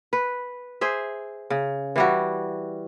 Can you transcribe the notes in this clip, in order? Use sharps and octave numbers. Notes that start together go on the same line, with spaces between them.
B4
G#4 C5 E5
C#3
E3 G3 F#4